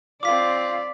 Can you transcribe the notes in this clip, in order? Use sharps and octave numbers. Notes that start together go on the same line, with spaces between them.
C4 F4 D5 D6 B6